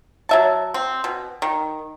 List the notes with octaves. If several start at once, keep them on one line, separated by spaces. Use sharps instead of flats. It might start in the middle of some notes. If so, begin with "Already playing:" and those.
F#3 E5 A5
C4
B2
D#3